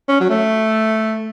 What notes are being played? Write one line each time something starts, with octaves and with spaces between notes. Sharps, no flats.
C#4
F#3
A3